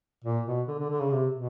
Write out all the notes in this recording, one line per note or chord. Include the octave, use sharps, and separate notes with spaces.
A#2
B2
D3
D3
D3
C#3
C3
B2